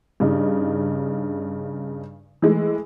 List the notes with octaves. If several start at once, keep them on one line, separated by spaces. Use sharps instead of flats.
G2 C#3 D4 D#4
E3 G#3 A3